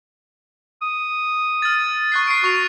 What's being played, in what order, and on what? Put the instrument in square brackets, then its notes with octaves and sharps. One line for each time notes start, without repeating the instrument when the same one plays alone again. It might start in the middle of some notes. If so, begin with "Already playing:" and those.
[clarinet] D#6
[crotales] F6 A6
C#6 F#6 C7
C7 D7
[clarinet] F#4 [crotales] C#6 F7